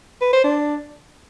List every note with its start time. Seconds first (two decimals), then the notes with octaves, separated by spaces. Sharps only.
0.22 B4
0.33 C5
0.44 D4